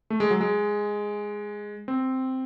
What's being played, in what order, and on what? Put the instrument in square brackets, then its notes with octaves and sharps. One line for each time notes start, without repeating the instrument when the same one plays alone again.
[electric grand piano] A3
G#3
F#3
G#3
C4